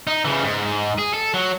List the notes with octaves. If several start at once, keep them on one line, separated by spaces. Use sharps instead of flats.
D#4
C#3 E3
G#2
G#4
A4
F#3